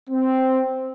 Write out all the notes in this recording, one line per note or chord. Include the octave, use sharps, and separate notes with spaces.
C4